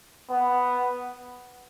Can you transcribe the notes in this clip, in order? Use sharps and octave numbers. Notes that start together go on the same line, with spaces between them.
B3